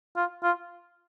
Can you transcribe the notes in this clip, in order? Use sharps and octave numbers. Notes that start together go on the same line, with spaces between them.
F4
F4